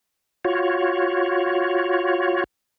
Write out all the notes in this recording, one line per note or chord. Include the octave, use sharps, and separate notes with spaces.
F4 F#4 C#5